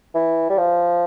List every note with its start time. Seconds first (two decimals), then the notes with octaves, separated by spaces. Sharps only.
0.15 E3
0.50 G3
0.58 F3